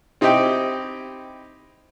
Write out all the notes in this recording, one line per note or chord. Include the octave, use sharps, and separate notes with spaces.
C4 D#4 E4 G4 D#5 G5